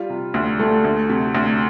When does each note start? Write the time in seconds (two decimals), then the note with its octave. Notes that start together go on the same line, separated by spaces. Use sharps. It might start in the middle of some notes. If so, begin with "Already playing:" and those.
Already playing: G3 F4
0.10 C3
0.34 D2
0.59 A3
0.84 D2
1.09 C3
1.35 D2